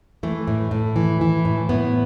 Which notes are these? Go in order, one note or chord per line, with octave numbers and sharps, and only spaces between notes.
E3 A3
A2
A2
E3
E3
A2
A2 B3